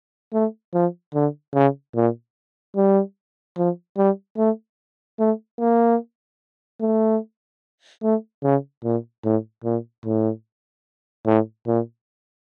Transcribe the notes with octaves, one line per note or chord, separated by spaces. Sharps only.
A3
F3
D3
C#3
A#2
G3
F3
G3
A3
A3
A#3
A3
A3
C#3
A#2
A2
A#2
A2
A2
A#2